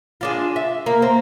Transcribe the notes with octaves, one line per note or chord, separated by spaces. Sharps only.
G#3 D4 F4
E5
A#3
C4